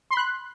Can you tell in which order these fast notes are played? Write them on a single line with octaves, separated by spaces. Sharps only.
C6 B5 F#6